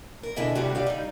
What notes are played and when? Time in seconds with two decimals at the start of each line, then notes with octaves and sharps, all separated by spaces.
0.23 A#4
0.36 F2 B2 D3 E4 G#4 E5
0.55 D2 C3 G3 F#4
0.75 G4 D5 F5
0.86 G3 D#4